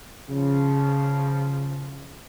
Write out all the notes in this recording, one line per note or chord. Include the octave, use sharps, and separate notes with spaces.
C#3 F3